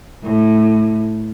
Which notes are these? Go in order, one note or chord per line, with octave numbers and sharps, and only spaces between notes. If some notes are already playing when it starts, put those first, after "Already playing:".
A2